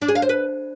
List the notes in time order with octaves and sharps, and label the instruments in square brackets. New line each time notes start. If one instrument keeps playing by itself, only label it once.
[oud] D4
G#4
F5
C5
B4